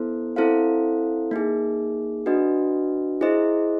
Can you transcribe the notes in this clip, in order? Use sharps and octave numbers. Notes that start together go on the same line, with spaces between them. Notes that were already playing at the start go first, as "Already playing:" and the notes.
Already playing: B3 E4 A4 C5
C4 E4 A4 C5 F5
A#3 D#4 G#4
D4 F#4 B4 D#5
E4 G#4 C5 D#5